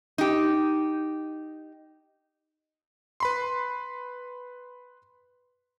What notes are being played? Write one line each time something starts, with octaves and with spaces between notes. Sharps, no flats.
D#4 G4
B4 B5 C6